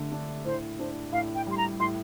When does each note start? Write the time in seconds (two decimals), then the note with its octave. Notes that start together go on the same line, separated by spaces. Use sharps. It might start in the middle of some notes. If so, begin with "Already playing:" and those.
Already playing: D3 A3
0.12 D4
0.45 A2 C5
0.79 D4 C5
1.13 A2 F5
1.35 G5
1.47 G3 C6
1.57 A#5
1.80 A2 C6